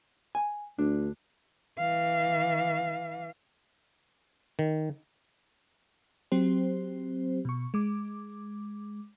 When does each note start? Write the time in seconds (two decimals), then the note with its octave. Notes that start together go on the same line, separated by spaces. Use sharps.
0.35 G#5
0.79 D2 D4
1.78 E3 F5
4.59 D#3
6.32 F#3 C4 G4 C5
7.45 B2 C#6
7.74 G#3 D6